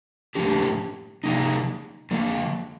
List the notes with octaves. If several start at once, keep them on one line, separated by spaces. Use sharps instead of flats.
A2 F3 A#3 D4 G4
C3 F3 A#3 D#4
D3 F3 A#3